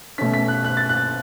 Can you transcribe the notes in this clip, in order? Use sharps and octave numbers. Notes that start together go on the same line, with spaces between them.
B2 A3 C#4 B6
B6
F#6
F#6
A6
F#6